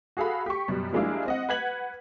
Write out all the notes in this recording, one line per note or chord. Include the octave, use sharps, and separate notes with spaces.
F#4 G#4 A4 F5 B5
G4 C#6
F#2 B2 G3
F3 G3 G#3 A#3 D4 E4
C4 D#5 F#5
B4 F#5 G#6 B6 F#7